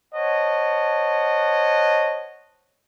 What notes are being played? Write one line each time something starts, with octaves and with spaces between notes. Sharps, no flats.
C5 C#5 D#5 F#5 A5